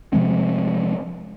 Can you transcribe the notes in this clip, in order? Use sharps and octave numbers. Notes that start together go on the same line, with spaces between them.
C3 F3 G#3 C4